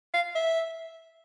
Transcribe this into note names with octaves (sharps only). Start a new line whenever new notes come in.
F5
E5